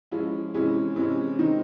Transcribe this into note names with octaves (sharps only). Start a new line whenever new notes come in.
F3 G#3 C#4 E4
C3 E3 G#3 C#4 E4
C3 E3 G#3 C#4 E4
D#3 G#3 C4 D#4